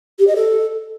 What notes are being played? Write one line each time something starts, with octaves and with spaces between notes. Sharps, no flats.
G4
D#5
A4